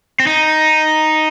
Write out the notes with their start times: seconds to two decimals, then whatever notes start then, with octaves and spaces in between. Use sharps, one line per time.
0.20 C4
0.27 D#4